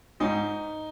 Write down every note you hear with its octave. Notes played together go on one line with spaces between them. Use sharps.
G#2 D#4